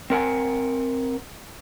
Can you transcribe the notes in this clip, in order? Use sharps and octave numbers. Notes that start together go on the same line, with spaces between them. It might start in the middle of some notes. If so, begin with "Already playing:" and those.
C4 A#4 F#5 G#5